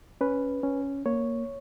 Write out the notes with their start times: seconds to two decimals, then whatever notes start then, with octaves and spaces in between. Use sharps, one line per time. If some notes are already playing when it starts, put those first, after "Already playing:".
0.21 C#4 B4
0.63 C#4
1.06 A#3 C#5